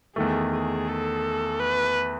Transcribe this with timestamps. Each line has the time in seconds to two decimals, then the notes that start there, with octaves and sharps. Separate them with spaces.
0.16 E2 D#3 A3 G#4
0.52 G#4
0.88 A4
1.60 B4